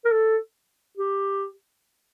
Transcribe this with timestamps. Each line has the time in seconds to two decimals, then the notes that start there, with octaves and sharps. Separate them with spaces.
0.05 A#4
0.11 A4
0.97 G4